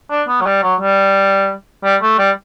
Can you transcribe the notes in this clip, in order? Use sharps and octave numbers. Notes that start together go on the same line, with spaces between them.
D4
B3
F#3
G3
F#3
G3
G3
A3
G3